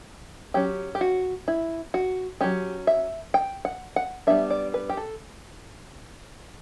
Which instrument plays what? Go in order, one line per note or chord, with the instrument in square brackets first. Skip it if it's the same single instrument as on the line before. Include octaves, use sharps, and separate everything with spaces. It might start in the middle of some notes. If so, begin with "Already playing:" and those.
[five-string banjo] F#3 C#4 G4
G4
F#4
E4
F#4
F#3 C#4 G4
E5
G5
F#5
F#5
G3 B3 D4 E5
D5
B4
G4
A4